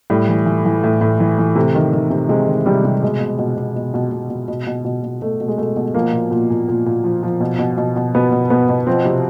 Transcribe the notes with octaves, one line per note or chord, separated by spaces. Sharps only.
A2 G3
E3
E3
E3
A2
A2
E3
E3
C3 A3
D#3
D#3
C3
C3 G#3
D#3
C3 G3
C3
B2 G#3
B2
B2
B2
B2
B2
B2
B2
B2
B2
B2
B2
B2 A3
B2
G#3
B2 A3
B2
F3 A#3
A#2
A#2
A#2
A#2
A#2
F3
F3
B2
B2
B2
B2
B2 B3
B2
B2 B3
B2
F3 C4
C3